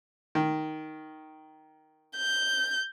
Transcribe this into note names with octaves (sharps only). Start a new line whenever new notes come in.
D#3
G6